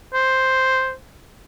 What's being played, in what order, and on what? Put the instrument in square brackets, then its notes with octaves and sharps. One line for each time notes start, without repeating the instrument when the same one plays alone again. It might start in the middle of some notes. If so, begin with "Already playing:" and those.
[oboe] C5